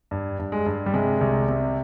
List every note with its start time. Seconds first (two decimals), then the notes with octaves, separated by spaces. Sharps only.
0.11 G2
0.39 G2
0.52 G#3
0.66 G2
0.86 G3
0.94 C3 G#3
1.21 C2
1.48 C3